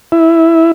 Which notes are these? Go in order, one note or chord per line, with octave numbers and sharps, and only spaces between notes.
E4